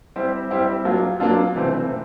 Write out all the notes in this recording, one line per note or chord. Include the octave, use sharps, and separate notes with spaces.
G3 C4 E4 G4
G3 C4 E4 G4
F#3 A#3 D4 F4
F#3 A#3 D4 F4
C3 E3 A3 C4
C3